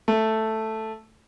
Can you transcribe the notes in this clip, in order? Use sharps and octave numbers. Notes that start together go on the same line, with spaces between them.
A3